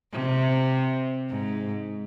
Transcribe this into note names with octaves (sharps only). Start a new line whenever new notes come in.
C3
G#2